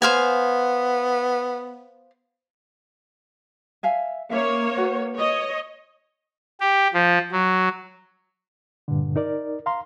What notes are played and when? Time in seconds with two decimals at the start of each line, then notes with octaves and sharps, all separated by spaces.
0.02 B3 C5 F5 G#5
3.83 E5 F5 G#5
4.30 A#3 C#4 C#5 E5 F5
4.77 F#4 B4 F#5
5.18 C#5 D#5
6.61 G4
6.94 F3
7.32 F#3
8.88 G2 A#2 D3
9.16 D#4 A#4 D5
9.66 F5 A#5 C6